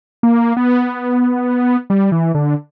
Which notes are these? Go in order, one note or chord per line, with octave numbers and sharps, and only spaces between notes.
A#3
B3
G3
E3
D3